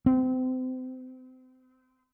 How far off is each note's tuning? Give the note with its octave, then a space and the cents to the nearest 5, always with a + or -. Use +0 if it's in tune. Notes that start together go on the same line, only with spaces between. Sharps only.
C4 -30